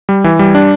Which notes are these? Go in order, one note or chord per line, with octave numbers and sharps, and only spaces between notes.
G3
E3
G3
D4